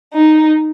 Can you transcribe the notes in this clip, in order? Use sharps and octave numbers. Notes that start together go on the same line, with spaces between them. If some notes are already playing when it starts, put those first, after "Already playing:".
D#4